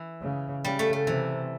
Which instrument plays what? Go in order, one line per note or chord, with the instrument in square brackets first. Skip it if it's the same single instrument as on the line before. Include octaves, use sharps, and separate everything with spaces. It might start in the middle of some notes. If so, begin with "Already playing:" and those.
Already playing: [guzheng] E3
[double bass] C#3
[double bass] C#3 [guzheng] G3
[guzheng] A3
A3
[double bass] C3 [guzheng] E3